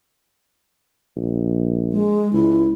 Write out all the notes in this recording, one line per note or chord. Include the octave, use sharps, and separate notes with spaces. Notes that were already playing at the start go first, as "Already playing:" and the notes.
A#1
G#3
C#2 E4